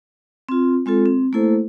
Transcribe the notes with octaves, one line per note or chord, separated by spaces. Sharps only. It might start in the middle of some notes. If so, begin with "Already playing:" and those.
C4 F4
G#3 C4 F4 A4
C4
A3 A#3 E4 A4 C5